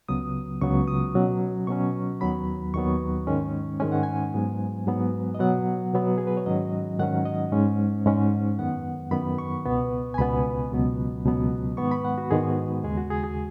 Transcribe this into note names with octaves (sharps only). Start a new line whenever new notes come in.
C#2 C#3 F#3 B3 D#6
C#2 C#3 F#3 B3 C#6
D#6
B2 F#3 C#4
B2 F#3 C#4 C#6
D#2 D#3 F#3 B3 B5
D#2 D#3 F#3 B3 C#6
G#2 D#3 G#3 C#4
G#2 D#3 G#3 C#4 G#5
F#5
G#5
G#2 F#3 B3
G#2 F#3 B3
D#5
B2 F#3 B3 F#5
B2 F#3 B3
G#4
B4
C#5
G#2 D#3 F#3 C#4 D#5
G#2 D#3 F#3 C#4 F#5
D#5
G#2 G#3 C#4
G#2 G#3 C#4
F#2 D#3 B3 F#5
F#2 D#3 B3 B5
C#6
C#2 B2 B3
G#5
C#2 B2 B3 B5
C#2 B2 F#3 B3
C#2 B2 F#3 B3
G#2 D#3 G#3 B3 C#6
B5
F#5
F#4
G#2 D#3 G#3 B3 G#4
D#2 C#3 G#3 G#4
F#4
G#4
G#4